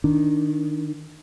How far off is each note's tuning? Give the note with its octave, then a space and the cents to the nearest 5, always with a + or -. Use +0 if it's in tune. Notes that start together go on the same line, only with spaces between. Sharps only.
D#3 +0 D4 +0